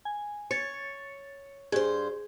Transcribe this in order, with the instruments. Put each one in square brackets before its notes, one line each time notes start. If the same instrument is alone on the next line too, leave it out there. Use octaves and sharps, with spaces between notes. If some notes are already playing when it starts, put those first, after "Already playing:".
[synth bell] G#5
[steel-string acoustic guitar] C#5 [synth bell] A6 C#7
[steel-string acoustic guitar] G2 C5 [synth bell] G#4